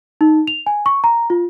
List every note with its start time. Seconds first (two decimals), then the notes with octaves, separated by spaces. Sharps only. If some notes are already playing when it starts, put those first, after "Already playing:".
0.21 D#4
0.47 F7
0.66 G#5
0.86 C#6
1.04 A#5
1.30 F4